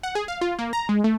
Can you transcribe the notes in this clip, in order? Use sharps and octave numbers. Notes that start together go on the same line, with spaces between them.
F#5
G#4
F5
F4
A#3
A#5
G#3
A3